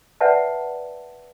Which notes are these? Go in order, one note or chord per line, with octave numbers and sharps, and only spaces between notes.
B4 D5 E5 F#5 G5 A5